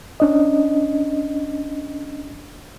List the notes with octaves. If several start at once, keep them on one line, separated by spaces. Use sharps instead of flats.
C#4 D4 D#5